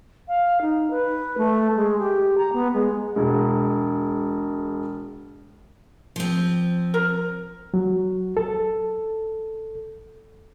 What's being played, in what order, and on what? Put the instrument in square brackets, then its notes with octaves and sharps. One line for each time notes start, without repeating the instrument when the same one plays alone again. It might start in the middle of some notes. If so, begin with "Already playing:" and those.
[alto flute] F5
D#4
B4
A3
G#3
G4
A#5
B3
G#3
[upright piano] E1 G#3
[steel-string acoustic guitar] F3 C4
[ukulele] A#4
[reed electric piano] F#3
A4